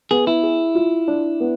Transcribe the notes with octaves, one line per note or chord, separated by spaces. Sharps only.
B3 G#4
E4
G#4
F4
D4
B3